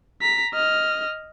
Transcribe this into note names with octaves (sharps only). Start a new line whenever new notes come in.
A#5 B6
D#5 F6